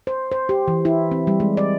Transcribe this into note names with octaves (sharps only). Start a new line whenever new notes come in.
C5
C5
G4
E3
E4
C4
G3
G#3
D5